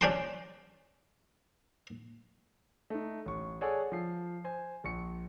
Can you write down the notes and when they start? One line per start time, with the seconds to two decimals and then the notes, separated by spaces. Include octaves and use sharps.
0.01 C#4 D4 G4 G5 A5 C6
2.90 A3 D#4
3.26 A1 C#6
3.61 G#4 A4 C#5 D5 F#5 G#5
3.92 F3 C7
4.44 C5 G#5
4.84 A#1 C#6 C#7